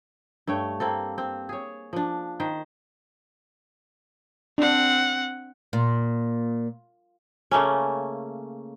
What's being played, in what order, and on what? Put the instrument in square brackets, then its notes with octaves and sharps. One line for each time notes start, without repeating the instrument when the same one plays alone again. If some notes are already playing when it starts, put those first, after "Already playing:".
[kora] G2 A3 C#5 G5
A#3 C4 A4
C4
G#4 C#5
F3 D4
D#3 C5
[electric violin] C4 F#5 [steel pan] D4
[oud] A#2
[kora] C#3 A3 A#3 C#4